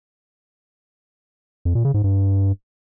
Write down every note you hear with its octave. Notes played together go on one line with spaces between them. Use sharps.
F2
A#2
C#3
G#2
G2